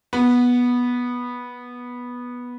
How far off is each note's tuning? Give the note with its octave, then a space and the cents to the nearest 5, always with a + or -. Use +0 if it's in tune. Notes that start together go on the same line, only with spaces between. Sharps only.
B3 -10